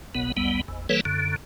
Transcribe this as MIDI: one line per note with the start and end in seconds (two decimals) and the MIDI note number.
0.15 0.32 30
0.15 0.32 35
0.15 0.32 47
0.15 0.32 59
0.37 0.61 35
0.37 0.61 40
0.37 0.61 55
0.37 0.61 59
0.68 0.87 32
0.68 0.87 40
0.89 1.01 52
0.89 1.01 55
0.89 1.01 58
0.89 1.01 69
0.89 1.01 71
0.89 1.01 73
1.05 1.36 42
1.05 1.36 50